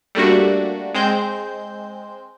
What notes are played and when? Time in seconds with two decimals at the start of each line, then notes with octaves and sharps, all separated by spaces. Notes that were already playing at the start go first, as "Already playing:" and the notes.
0.15 G3 A3 A#3 D4 F#4
0.95 G#3 C4 C5 G6